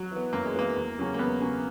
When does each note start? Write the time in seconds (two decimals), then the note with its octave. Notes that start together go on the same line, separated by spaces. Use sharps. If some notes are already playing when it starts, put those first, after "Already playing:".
Already playing: F#3
0.11 E3 B3
0.33 F#2 A#3
0.45 G#3
0.55 E3 A#3 B3
0.76 E2
0.98 C#3 F#3 C#4 G#4
1.14 A#3
1.19 E2 B3
1.40 C#3 F#3 C#4 G#4